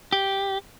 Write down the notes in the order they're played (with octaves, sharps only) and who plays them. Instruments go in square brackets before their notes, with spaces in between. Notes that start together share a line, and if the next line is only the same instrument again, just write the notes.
[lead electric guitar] G4